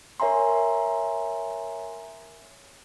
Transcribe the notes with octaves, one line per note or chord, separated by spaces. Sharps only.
A#4 C#5 E5 G#5 A#5 C6